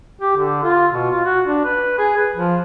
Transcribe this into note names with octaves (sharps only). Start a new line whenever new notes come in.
G4
D3
F4
B2
F4
F#4
D4
B4
G#4
B4
F3